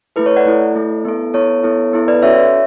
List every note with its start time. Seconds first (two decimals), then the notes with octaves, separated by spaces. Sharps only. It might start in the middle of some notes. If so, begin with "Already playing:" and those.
0.16 A3 E4 A4 B4
0.26 C#5
0.36 D5 F#5
0.46 A3 E4 A4
0.76 A3 E4 A4
1.05 B3 E4 A4
1.34 B3 E4 A4 C#5
1.63 B3 E4 A4
1.93 B3 E4 A4
2.08 B4 D5
2.22 C#4 F#4 A4 C#5 E5